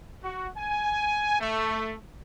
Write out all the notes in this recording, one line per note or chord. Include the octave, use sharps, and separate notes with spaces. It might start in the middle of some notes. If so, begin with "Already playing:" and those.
F#4
G#5
A3